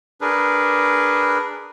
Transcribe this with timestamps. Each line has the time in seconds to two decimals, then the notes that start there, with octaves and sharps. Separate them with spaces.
0.21 D4 G#4 A#4 B4